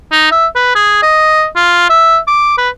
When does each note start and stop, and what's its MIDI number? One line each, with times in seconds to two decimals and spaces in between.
0.12 0.27 63
0.31 0.46 76
0.55 0.71 71
0.75 0.98 68
1.02 1.47 75
1.56 1.89 65
1.89 2.19 76
2.27 2.54 86
2.58 2.69 71